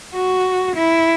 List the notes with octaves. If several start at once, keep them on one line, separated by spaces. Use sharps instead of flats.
F#4
E4